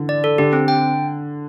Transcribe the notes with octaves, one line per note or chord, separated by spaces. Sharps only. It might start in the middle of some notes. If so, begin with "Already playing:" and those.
Already playing: D3 E3
D5
A4
D3 G4
C4
G5